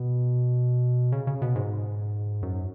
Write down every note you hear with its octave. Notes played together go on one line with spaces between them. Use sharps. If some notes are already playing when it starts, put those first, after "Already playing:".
Already playing: B2
C#3
C#3
B2
G#2
F#2